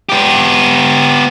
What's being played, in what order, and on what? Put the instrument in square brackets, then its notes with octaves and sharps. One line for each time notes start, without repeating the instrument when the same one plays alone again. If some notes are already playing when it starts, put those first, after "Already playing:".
[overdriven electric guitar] B3 G4